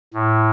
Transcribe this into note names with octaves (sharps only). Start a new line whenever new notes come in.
A2